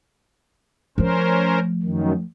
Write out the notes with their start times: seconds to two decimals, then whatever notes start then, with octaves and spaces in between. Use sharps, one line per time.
0.98 F3 A3 C#4 A#4 C5
1.83 F#2 D#3